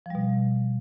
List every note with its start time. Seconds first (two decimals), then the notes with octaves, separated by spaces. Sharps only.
0.06 F3
0.10 G3
0.15 B2